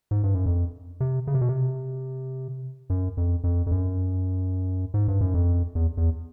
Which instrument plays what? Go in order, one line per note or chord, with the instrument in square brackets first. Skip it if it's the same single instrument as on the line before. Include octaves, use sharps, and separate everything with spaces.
[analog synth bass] G#2
G2
F#2
F2
C3
C#3
C3
B2
C3
F#2
F2
F2
F2
F#2
G#2
G2
F#2
F2
E2
E2